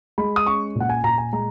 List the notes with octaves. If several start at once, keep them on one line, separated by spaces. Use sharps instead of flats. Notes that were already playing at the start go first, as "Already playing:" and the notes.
G#3 B5
D#6
C#4 C#6
A#2
F#5
G#5
A#2 A#5
G#5
G#3 A#5